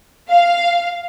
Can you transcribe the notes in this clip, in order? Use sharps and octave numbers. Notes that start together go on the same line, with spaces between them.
F5